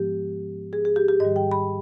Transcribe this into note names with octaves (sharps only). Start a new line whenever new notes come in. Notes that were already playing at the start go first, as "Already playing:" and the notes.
Already playing: G#2 F3 G#3 B3 G4
G#4
G#4
G4
G4
G#2 D#3 G3 D#5
G5
B5